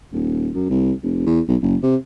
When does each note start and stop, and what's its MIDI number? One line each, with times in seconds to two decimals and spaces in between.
0.13 0.50 27
0.55 0.68 42
0.70 0.92 36
1.03 1.22 29
1.26 1.41 40
1.48 1.57 35
1.62 1.76 30
1.83 1.96 48